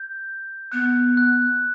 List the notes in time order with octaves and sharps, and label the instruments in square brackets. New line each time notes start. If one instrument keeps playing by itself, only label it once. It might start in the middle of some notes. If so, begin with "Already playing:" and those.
Already playing: [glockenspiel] G6
[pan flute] B3 [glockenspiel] F#6
[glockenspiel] F#6